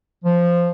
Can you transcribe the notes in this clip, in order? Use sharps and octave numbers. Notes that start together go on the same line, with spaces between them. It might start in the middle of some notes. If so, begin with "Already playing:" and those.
F3